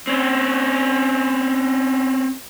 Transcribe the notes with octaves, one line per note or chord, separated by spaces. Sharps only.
C4 C#4